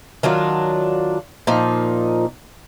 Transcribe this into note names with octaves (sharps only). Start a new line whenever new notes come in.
D#3 F#3 D4 F4
A#2 F3 D#4